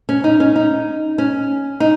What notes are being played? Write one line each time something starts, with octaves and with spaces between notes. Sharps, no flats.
C#4
D#4
C#4
D#4
C#4
D#4